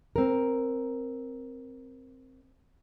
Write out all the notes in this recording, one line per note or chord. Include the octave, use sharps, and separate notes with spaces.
C4 A#4